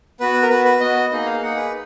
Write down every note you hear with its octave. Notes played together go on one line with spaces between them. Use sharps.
B3 F#4 B4
A#4
B3 F#4 B4
B4
B3 F#4 D#5
A#3 D#4 G#4 D#5
F5
A#3 D#4 G#4 F#5
B4